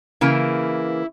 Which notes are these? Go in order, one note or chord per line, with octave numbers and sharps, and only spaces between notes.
C#3 E3 A#3 E4